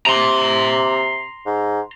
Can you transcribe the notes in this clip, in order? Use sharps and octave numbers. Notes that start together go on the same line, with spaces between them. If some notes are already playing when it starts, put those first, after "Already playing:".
C3 A#5 C6
G#2